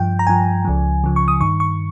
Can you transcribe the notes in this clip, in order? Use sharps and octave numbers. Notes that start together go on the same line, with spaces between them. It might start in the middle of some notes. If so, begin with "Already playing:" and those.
Already playing: G2 F3 G5
A#5
G2 F3 G#5
C#2 C#3 F3
C#2 C#3 F3
C#6
D#6
G2 D#3 C#6
C#6